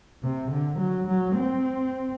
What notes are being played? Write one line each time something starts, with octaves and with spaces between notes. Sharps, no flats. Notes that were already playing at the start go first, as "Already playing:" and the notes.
C3
D3
F#3
F#3
C4